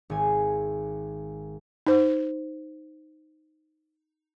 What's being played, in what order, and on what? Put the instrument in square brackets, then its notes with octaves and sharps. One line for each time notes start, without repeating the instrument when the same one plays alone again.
[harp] G#1 G#5
[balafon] D#4 C5